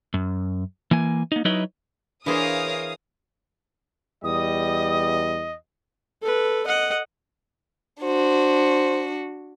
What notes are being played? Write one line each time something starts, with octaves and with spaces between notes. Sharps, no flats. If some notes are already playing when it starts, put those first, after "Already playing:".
F#2
E3 A#3 G#5
A#3 D#4
F#3 D#4 E4 B4 C#5 D#5
E3 D4 G#4 A#4 C5 C#5 F5 D#6
E2 G3 D#5 D#6
A4 B4
D#5 F#5
D4 F#4 C5